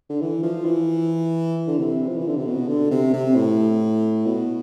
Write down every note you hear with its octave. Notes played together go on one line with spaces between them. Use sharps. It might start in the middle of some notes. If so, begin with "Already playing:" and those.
D3
E3
F3
E3
D3
C3
F3
E3
D3
C3
B2
D3
C3
C3
A2
B2